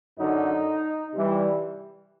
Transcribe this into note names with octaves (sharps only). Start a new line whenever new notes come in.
F#2 D3 F#3 D#4
C3 E3 G3